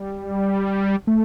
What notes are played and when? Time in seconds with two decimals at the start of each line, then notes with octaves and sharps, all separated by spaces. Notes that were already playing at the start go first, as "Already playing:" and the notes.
Already playing: G3
1.07 A3